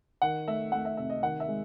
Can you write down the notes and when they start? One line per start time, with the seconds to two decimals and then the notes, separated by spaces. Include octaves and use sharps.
0.22 D#3 F#5
0.48 A3 E5
0.72 A3 F#5
0.85 E5
0.97 C3 E5
1.10 D#5
1.23 D#3 F#5
1.40 E5
1.48 G#3